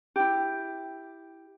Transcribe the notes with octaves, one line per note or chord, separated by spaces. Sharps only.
E4 G4